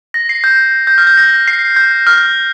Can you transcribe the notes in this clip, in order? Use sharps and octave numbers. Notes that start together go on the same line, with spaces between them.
A#6
C7
G6
G6
F6
G6
A#6
C7
G6
F6